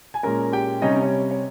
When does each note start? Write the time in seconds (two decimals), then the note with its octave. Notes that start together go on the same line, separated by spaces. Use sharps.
0.14 G#5
0.23 A#2 G#3 C#4 A#4 A#5
0.53 G4 G5
0.82 C3 G3 C#4 D#4 D#5
1.01 C#4 C#5
1.31 C#5